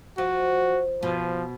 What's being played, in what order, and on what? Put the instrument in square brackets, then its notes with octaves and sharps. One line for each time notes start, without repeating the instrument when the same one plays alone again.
[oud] F3 [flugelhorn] F#4
[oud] B2 [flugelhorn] F3